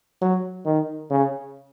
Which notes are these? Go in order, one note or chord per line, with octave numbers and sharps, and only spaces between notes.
F#3
D#3
C#3